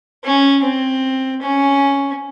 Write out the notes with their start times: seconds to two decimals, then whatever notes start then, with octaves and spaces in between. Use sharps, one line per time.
0.24 C#4
0.63 C4
1.42 C#4